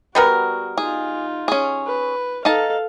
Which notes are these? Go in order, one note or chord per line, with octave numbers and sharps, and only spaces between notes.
G3 B3 F#4 A#4
D#4 F4 G#4
C#4 G#4
B4
D#4 A4 F5 A5